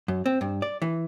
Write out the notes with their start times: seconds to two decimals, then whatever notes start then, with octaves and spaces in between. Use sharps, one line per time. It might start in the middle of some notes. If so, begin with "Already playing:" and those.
0.08 F#2
0.26 C4
0.41 G2
0.62 D5
0.82 E3